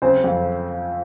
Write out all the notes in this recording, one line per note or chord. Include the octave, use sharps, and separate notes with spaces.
C#3 C4 C5
F2